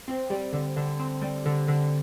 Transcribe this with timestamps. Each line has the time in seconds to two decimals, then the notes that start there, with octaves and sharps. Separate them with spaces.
0.08 C4
0.30 G3
0.53 D3
0.76 D3
0.99 C4
1.22 G3
1.45 D3
1.68 D3